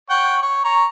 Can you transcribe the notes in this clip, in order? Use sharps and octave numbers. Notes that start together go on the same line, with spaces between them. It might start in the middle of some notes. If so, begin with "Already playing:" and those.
C#5 F#5 G5
C#5
C#5 A#5